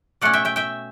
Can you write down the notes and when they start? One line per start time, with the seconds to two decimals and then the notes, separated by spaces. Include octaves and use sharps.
0.21 B2 A3 C#4 D5 F#5
0.33 E5 G5
0.45 E5 G5
0.56 E5 G5